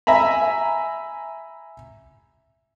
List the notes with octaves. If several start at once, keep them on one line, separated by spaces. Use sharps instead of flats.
E5 G#5 A#5 B5